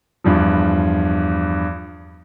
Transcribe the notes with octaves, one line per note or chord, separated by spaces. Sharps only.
E2 G2 F3